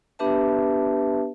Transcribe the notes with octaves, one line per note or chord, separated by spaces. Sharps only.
B3 D4 G4 B4 E5 A5